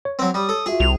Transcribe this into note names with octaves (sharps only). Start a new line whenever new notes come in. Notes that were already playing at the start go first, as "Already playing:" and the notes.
C#5
F#3 C4
G3 D#6
A4
F4 F#4 G#4 E5
C2 F7